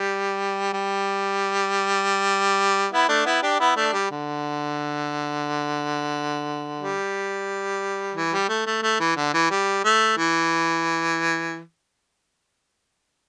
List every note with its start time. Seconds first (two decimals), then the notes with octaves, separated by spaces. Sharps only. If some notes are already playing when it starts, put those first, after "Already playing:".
Already playing: G3
0.73 G3
2.92 B3 E4
3.08 A3 D4
3.25 B3 E4
3.42 D4 G4
3.60 B3 E4
3.76 A3 D4
3.93 G3
4.11 D3
6.80 G3
8.15 E3
8.33 G3
8.49 A3
8.66 A3
8.83 A3
9.00 E3
9.16 D3
9.34 E3
9.51 G3
9.85 A3
10.17 E3